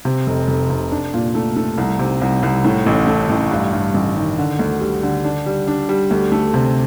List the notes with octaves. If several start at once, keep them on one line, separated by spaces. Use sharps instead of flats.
C3
F1
F1
C3
D4
A#2
A3
A3
C2
C3
C2
C2
A2
A1
A3
A1
G2
G2
A1
D#3
D3
D2
G3
D3
D4
G3
D4
G3
D2
A3
C3